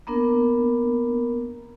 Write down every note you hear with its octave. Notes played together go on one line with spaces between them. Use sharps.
A#3 B3 D4 A#4